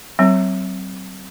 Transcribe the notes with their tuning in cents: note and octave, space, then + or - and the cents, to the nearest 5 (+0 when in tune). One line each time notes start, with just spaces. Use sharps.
F#3 +35 C4 +0 C#5 -15